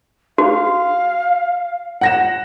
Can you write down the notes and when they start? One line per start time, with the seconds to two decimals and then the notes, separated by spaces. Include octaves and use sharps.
0.38 F#4 F5
2.01 F#5 A#6 E7